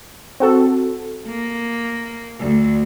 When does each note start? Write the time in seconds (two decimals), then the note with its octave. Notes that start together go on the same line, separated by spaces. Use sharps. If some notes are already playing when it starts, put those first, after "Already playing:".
0.40 C4 F#4 A4
1.27 A#3
2.40 D2